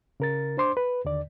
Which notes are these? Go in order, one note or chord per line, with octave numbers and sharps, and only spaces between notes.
C#3 A#4 A6
D4 C5 C6 D6
B4
D#2 D3 D5